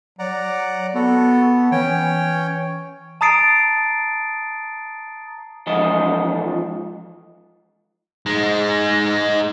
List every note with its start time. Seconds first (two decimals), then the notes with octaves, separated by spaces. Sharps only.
0.19 F#3 D5 F#5 A#5
0.95 B3 F#4 A4
1.72 E3 C#4 C#5 G5
3.21 A5 A#5 D#6 A6 C7 D7
5.67 G#2 E3 F3 F4 D#5
8.26 G#3 D#4